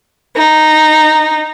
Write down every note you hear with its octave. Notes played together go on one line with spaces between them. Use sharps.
D#4